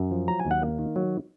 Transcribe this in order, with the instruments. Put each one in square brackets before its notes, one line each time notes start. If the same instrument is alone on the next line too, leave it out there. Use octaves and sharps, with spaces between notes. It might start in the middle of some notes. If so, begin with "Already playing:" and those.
Already playing: [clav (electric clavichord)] F#2
F3
F#3 A#5
G#5
D#2
F#5
A#3
D#3
F#3